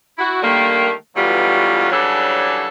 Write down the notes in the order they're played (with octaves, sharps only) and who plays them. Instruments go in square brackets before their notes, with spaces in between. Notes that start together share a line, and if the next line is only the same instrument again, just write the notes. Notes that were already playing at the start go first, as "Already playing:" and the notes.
[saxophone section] E4 F#4
D3 D#3 G3 A3 A#3
D2 B2 E3 F#3 G3 F4
C#3 E3 F#3 G3 D4 A4